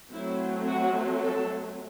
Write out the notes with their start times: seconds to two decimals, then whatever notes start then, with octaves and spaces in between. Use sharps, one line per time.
0.12 F#3 A3 C4 E4
0.68 F#4
1.24 A4